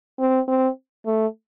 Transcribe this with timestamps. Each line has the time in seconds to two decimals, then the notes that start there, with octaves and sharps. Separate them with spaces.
0.19 C4
0.48 C4
1.06 A3